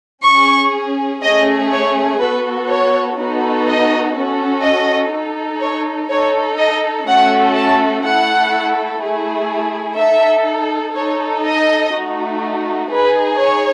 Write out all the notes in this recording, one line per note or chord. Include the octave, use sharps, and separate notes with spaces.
C#4 G#4 C#6
A3 C#4 G#4 D#5
C#5
B3 F#4 A4 B4
C#5
B3 D#4 F#4 A4
D#5
C#4 F#4 A4
D#5
D#4 A4
C#5
D#4 A4 C#5
D#5
A3 C#4 F#4 A4 F#5
A5
A3 E4 A4 F#5
A3 E4 G#4
D#4 A4 E5
D#4 A4 C#5
D#5
A3 D#4 F#4
D#4 G#4 B4
C#5